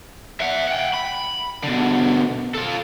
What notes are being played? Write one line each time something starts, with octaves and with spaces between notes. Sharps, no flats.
E5 F#5
F#5 G5
B5
B2 D3
F4 A4